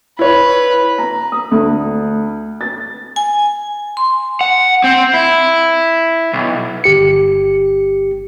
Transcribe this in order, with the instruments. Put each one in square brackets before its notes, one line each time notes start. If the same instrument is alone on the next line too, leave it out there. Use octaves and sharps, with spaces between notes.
[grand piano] E4 C#5 [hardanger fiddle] B4
[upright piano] A#5
D#6
D2
A6
[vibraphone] G#5
C6
[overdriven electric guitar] F#5
C4
E4
B1
[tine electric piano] G1 G4 C#7